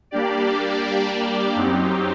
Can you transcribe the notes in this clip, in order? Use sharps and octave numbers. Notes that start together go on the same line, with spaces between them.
G3 A#3 D4 G4 D5
F#2 F#3 C4 D#4 G4